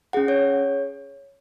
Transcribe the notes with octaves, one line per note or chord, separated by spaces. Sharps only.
C#4 G#4 F#5
C#5